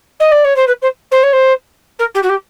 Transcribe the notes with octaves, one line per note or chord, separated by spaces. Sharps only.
D#5
D5
C#5
C5
B4
C5
C5
C#5
C5
A#4
G4
F#4
G4